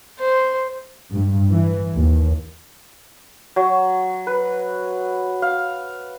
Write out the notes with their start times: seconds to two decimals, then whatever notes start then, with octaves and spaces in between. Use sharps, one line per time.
0.19 C5
1.13 G2
1.52 E3
1.94 D#2
3.56 F#3
4.27 B4
5.42 F5